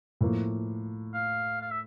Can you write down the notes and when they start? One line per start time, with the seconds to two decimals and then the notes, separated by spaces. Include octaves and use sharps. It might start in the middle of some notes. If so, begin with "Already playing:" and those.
0.21 A2 F3 A#3
1.15 F5
1.61 F5
1.71 E5